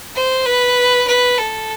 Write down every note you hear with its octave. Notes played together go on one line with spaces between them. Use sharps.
C5
B4
B4
A4